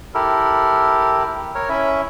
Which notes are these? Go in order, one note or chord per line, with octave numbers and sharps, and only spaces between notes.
E4 G4 A4 A#4
A#4 C#5
C#4 E4 E5